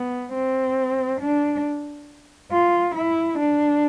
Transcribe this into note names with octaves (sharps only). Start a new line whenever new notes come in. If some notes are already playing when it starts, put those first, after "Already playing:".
Already playing: B3
C4
D4
F4
E4
D4